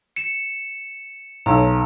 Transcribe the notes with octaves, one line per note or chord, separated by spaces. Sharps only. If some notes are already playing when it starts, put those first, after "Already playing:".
C#7 E7
B1 C#5 A#5 E6